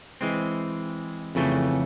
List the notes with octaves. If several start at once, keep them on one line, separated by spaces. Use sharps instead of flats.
E3 G#3 C4
F2 C#3 E3 A3